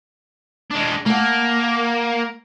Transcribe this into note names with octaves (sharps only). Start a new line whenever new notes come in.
G#3 D4
A3 A#3 F#5